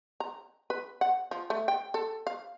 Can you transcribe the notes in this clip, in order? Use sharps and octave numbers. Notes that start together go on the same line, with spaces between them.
A#5
B4
F#5
F3
A3
G5
A4
F5